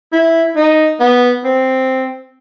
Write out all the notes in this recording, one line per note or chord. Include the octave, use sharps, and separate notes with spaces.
E4
D#4
B3
C4